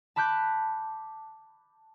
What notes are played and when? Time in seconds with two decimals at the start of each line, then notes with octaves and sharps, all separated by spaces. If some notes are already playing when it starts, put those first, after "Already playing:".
0.16 A5 B5 D6 F#6 G6